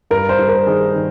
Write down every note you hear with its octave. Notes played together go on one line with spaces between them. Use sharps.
G2 A#4
C5
G2
A#4
D#3 G#4
D#3